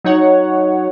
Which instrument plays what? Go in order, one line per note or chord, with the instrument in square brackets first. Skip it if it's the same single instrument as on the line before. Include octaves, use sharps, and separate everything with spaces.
[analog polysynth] F#3 D#4 C#5 F#5